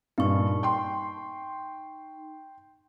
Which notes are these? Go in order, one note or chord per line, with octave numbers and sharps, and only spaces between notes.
G2 A#2 A#3 D#4 C#6
G5 C6